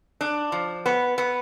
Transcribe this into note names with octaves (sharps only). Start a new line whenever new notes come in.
D4
F3
B3
B3